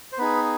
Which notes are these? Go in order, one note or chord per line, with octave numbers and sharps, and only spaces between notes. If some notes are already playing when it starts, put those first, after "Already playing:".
C5
B3 D#4 G#4 B4